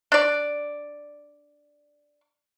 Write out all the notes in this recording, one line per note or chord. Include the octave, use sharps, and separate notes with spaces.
D4 D5